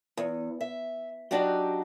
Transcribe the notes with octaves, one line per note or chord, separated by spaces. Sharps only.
E2
E5
F#3 D4 D#4 F#4 G4